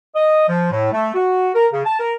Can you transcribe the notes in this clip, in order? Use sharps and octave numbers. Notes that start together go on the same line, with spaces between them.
D#5
F3
A2
A3
F#4
A#4
C#3
A5
A#4